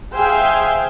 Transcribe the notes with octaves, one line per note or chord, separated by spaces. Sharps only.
G#4 C5 E5 F5 G5 G#5